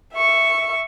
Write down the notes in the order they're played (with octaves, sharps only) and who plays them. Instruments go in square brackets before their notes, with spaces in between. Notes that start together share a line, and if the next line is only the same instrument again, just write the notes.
[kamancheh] E5 C#6